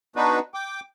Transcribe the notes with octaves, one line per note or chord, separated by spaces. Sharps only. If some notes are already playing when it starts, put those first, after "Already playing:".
B3 D4 D#4 F#4 B4
G5 D6